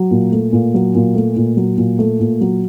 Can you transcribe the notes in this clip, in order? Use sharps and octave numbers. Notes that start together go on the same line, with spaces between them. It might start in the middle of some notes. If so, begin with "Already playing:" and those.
Already playing: F#3
A#2
A3
A#2
F#3
A#2
A3
A#2
F#3
A#2
A3
A#2
F#3